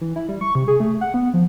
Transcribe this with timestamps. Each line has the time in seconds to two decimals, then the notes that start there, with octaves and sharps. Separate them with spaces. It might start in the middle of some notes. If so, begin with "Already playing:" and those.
0.01 E3
0.16 E4
0.28 G3
0.41 C#6
0.55 C3
0.68 G#4
0.80 A3
1.01 F#5
1.14 B3
1.34 F3